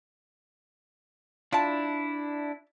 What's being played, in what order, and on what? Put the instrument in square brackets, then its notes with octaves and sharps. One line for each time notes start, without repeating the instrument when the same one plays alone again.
[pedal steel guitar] D4 E4 [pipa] F4 A5